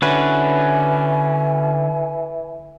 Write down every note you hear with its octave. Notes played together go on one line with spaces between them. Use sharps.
D3 E3 C#4 F#4 B4 G#5